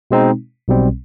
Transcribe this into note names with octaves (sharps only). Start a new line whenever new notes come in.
B2 G#3 C4 D#4
B1 B2 G3 C4